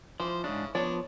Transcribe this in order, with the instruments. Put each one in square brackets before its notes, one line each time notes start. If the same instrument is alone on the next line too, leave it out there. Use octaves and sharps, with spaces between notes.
[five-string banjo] E3 [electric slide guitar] F3 [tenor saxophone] C5
[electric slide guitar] G#2 D4 [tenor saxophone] C#3
[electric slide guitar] F3 B3 [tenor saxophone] D4 [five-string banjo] C#5 D5